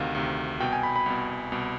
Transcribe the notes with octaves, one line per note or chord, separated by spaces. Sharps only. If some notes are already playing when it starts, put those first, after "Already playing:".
Already playing: D2 C3 D#3 F5
D2 C3 D#3
C2 B2 G5
G#5
B5
B5
C2 B2
C2 B2